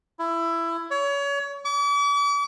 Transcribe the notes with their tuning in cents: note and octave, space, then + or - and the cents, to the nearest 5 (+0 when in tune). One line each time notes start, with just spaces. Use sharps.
E4 +20
C#5 +30
D6 -40